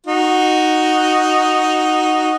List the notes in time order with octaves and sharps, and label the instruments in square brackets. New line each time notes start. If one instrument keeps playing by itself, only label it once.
[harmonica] D#4 F#4